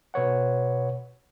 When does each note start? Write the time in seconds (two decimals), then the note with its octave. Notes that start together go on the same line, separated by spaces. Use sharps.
0.14 B2 B4 C#5 F#5